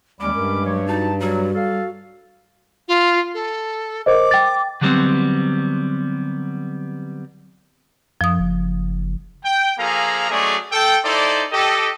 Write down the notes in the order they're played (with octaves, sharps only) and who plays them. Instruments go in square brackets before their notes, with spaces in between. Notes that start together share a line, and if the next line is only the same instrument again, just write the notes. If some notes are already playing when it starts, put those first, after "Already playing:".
[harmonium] D#2 G3 [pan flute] G#3 [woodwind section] C#4 B5 D6
[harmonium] G2 [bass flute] A#4
[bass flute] F#3 [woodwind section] G4 C#5
[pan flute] D#4 [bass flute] F#4 [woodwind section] A5
[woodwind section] F#3 [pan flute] G3 [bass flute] F#4
[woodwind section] A4 F5
[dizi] F4
A4
[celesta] A#4 C5 D#5 [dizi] D6
[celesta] G5 A6
[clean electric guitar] D3 F#3 G3 A3 B3 C4
[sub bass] F#2 [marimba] F3 D#6
[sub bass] F#1
[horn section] G5
F3 A#3 G#4 A4 F5 A#5
F#3 G#3 A3 C#4 G#4 D5
A4 G5
D#4 E4 A4 C5 D5
G4 A4 D#5